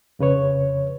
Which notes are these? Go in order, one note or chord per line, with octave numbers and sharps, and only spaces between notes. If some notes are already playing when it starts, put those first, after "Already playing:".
F2 C#3 B4 C#5